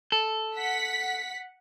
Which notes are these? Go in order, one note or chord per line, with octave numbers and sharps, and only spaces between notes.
A4
F#5 B6